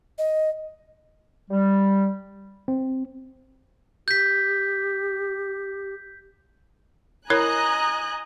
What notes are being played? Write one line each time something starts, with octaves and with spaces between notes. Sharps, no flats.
D#5
G3
C4
G4 G6 B6
E4 A#4 C#5 D#5 G#5 A#5 F#6